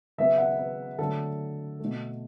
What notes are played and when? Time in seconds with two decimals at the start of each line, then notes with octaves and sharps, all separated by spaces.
0.18 C#3 F#3 B3 E5
0.38 F#5
0.58 B4
0.98 D3 F#3 A3 A4
1.80 B2 A3